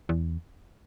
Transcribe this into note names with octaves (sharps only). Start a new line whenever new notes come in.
E2